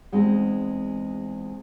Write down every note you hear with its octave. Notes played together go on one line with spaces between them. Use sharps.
E2 G#3 C4 D#4